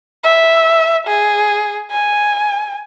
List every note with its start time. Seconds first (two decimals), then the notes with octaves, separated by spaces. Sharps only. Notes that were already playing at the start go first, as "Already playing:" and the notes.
0.24 E5
1.08 G#4
1.91 G#5